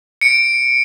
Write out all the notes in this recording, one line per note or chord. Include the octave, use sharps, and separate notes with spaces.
C#7 D7